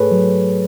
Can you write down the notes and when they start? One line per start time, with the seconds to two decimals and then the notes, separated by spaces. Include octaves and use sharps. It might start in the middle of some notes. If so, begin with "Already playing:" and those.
Already playing: G#2 A3 G#4 A4 B4 C#5
0.12 F#3